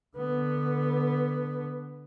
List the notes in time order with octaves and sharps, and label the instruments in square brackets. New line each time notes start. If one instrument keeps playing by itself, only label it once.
[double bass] D3 B3